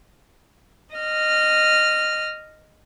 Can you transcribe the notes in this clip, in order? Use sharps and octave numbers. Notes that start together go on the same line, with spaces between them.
D#5 F6